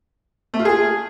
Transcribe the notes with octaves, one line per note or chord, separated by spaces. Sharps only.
A3
F4
G#4